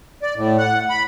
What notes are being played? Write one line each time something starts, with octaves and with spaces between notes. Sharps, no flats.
D5
A2
F#5
B5